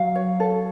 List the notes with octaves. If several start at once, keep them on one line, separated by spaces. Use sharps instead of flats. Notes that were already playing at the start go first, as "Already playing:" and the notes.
Already playing: F#3 F5
C#5
A4